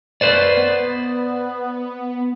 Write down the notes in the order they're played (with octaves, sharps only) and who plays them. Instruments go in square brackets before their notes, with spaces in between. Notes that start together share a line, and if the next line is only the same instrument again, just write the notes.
[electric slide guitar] B4 C5 D5 [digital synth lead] A6
[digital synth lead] B3